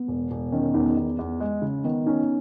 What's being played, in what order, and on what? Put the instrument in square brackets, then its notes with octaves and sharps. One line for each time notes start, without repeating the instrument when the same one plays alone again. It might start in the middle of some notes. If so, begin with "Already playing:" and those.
Already playing: [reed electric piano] B3
[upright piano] E1
E1
[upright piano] D#3 [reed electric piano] C#4
[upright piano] E2 [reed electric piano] D#4
[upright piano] E2
E2
G#3
C#3
[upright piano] D#3 [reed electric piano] B3
[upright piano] C#4 [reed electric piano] D#4